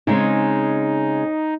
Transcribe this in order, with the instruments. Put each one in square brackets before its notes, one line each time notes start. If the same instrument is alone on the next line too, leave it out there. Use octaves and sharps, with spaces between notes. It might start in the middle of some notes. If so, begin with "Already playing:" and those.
[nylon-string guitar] C#3 G#3 C4 [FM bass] D#4